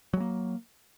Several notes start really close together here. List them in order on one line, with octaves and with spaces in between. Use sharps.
F#3 G#3 A#3